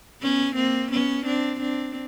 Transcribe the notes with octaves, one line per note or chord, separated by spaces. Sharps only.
B3 C#4
A#3 C4
B3 C#4
C4 D4
C4 D4